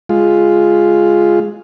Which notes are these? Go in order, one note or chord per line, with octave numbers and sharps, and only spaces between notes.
G#3 F4